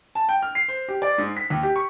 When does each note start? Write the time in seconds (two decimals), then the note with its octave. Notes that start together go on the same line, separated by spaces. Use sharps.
0.15 A5
0.29 G5
0.42 F6
0.55 C7
0.68 C5
0.88 G4
1.02 D5
1.18 G#2
1.37 B6
1.50 D#2
1.63 G4
1.76 C#6